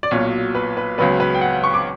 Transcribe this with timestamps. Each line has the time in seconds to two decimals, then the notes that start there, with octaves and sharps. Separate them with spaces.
0.03 D5
0.11 B1 A#2 F#3 C#5
0.55 B4
0.77 B4
0.98 C#2 C#3 F#3 B3 B4
1.20 B4
1.34 G5
1.41 F#5
1.53 F#5
1.64 C#6
1.74 D6